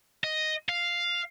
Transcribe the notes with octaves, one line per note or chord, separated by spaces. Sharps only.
D#5
F5